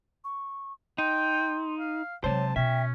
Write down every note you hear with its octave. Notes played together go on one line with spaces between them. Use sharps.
C#6
D#4 G5 C6
F5
C3 F#3 G#3 C5 C#5 A5
B2 C#4 E5 G5